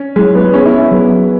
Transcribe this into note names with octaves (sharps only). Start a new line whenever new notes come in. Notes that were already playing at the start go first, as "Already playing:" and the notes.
Already playing: C#4
F#3 G#3 E4 C#5
B3
B3 C#4 G#4 C#5
E4
C#4
F#3 B3 G#4 B4